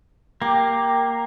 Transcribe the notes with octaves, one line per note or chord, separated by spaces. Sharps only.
A#3 G4